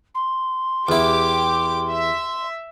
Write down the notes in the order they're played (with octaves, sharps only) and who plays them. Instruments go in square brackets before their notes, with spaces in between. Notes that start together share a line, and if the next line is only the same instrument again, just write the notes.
[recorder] C6
[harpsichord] E2 E4 [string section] G4 D6
[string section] E5